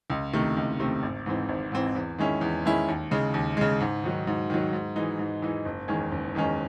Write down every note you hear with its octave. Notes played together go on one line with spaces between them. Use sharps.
C#2
C3 D#3 A3 C4
C#2
C3 D#3 A3 C4
G#1
G#2 E3 C4
G#1
G#2 E3 C4
E2
D#3 G#3 C#4 E4
E2
D#3 G#3 C#4 E4
D#2
C#3 G#3
D#2
C#3 G#3
G#2
D#3 F#3
G#2
D#3 F#3
G#2
E3 G#3 D#4
G#2
E3 G#3 D#4
F#1
E2 D#3 G#3 C#4
F#1
E2 D#3 G#3 C#4